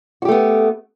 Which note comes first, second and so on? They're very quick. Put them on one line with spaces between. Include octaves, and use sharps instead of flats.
F#4 G4 A3 B3